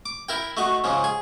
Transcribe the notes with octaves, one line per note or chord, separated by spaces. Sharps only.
D6
E4 A#4 G5
A3 D#4 F#4
G#2 C#3 F3
G#4